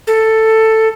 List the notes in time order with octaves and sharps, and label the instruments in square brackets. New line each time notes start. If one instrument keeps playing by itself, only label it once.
[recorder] A4